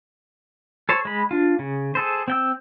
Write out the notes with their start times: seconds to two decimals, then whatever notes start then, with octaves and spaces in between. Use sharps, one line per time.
0.89 A4 C5 C#5
1.05 G#3 B5
1.31 D4 F4
1.59 C#3
1.95 G#4 A4 C5
2.28 C4 G5 E6